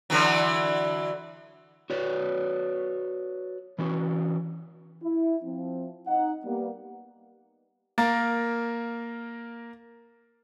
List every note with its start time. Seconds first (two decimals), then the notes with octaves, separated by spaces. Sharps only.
0.10 D3 E3 F#3
1.90 F#4 B4 C#5 D5
3.78 E3 C#4 F#4
5.03 E4
5.43 F3 C4
6.07 D#4 F#5
6.44 G3 A#3 B3
7.98 A#3 A#4 A6